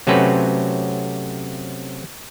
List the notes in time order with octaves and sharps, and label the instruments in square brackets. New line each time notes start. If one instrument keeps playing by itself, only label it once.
[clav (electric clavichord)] C3 F#3 A3 C4 C#4 B4